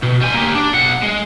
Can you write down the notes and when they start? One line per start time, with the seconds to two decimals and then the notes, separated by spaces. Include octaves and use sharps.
0.02 B2
0.21 G3 G#5
0.34 A#3 G4
0.55 D4
0.73 B1 F#5
1.02 G#3